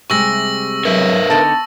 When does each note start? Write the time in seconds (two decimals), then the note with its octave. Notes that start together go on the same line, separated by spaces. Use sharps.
0.10 C3 G3 G#3 C#6 E6 A#6
0.85 F#3 A#4 B4 E5 E6
1.30 D3 B3 D#4 A5